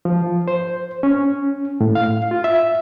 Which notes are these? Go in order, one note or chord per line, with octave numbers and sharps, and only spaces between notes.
F3
C5
C#4
A2
F5
F4
E5